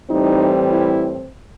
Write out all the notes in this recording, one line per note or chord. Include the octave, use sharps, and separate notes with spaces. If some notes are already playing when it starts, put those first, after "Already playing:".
A2 E3 G3 C4 D#4
E4